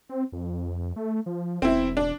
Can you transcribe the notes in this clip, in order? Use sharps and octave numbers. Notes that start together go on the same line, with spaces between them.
C4
F2
A3
F3
E1 C4 E4
D4